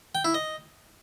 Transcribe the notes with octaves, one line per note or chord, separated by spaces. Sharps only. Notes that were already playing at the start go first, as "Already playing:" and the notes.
G5
E4
D#5